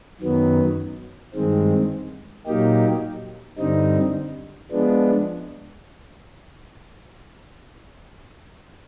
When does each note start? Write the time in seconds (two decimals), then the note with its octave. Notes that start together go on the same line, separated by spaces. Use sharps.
0.21 F#2 D#3 F#3 B3
1.34 G2 D#3 G#3 C4
2.47 A#2 F#3 A#3 D#4 G4
3.58 G2 D3 G3 C4 D#4
4.71 F3 G#3 B3 D4